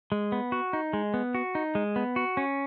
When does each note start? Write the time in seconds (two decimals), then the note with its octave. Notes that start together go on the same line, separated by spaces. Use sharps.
0.12 G#3
0.32 B3
0.52 F#4
0.73 D#4
0.93 G#3
1.14 B3
1.35 F#4
1.55 D#4
1.75 G#3
1.96 B3
2.16 F#4
2.37 C#4